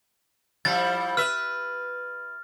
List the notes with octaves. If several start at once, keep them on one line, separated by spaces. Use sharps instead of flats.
F3 G3 E4 A6
B4 E5 F6